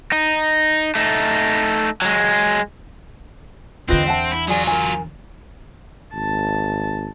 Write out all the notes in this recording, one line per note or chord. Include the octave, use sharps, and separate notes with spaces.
D#4
A3 D#4
F#3 G#3
E2 D3 C4 F4 B4 D#5
E5 F#5 A5
E4
F#3 F4 G#4 D5 G#5
A#4 G#5
G#1 A5